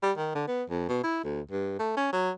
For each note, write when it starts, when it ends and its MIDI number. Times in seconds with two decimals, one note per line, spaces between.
0.02 0.12 55
0.18 0.32 51
0.35 0.46 50
0.48 0.63 59
0.69 0.86 41
0.89 1.00 47
1.03 1.23 64
1.24 1.41 38
1.51 1.75 43
1.79 1.94 57
1.97 2.08 61
2.13 2.30 54